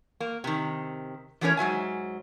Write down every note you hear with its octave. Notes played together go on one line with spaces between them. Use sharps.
A#3
C3 D#3
E3 F#3 A3 C#4 A#4 C#5
G#2 F#3 E5 G#5